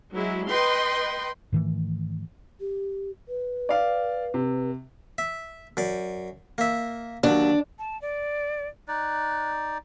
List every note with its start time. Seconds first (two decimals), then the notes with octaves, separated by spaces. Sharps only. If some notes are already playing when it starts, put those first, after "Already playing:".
0.13 F#3 G#3 E4
0.48 B4 D#5 G5 C6
1.52 G#2 D#3 E3 A3
2.60 G4
3.29 B4
3.69 D5 F5
4.34 C3
5.18 E5
5.77 F#2 D5
6.58 A#3 E5
7.23 D#2 F#3 D4
7.79 A5
8.02 D5
8.88 D#4 D5 F#6